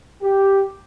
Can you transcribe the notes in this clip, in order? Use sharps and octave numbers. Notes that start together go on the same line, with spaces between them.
G4